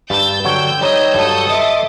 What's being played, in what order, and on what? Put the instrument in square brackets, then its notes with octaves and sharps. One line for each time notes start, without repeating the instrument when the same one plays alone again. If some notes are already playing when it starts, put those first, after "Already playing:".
[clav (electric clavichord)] G2 [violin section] E6 G6 [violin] A6
[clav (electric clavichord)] D3 F#3 C#5 [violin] G5
[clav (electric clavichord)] G3 D#4 [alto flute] C#5 [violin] D#5
[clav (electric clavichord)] G2 F#3 [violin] A4 D#6
[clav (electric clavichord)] D#5 [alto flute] E5 [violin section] C6 D6 A6